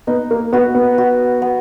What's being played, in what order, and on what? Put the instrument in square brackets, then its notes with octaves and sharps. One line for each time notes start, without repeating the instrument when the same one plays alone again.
[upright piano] B3 [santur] D#4
[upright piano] A#3
[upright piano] B3 [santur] F#4
[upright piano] B3
[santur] F#4
B3